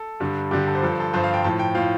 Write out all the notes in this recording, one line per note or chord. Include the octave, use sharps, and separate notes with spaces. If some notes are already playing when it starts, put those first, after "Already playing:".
Already playing: A4
G2 D3 G3
G2 D3 G3 G4
A4
C5
G2 F3 A4
C5
A4
G2 F3 C5
F5
G5
A2 F3 A5
G5
A2 F3 F5